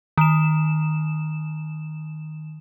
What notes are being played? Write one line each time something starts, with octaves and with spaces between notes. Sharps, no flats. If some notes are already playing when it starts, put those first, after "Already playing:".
D#3 E7